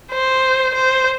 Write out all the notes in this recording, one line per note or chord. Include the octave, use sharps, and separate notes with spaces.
C5
C5